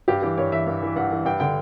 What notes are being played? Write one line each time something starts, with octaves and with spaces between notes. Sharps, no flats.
G2 G4
E3 G4
G2 C#5
E3 E5
G2
E3
G2 F#5
E3
G2 G5
D3 G5